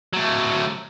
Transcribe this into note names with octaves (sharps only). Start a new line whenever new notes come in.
F#3 A3